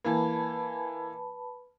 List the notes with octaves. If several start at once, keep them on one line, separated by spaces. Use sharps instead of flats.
E3 A#3 B4 A5 B5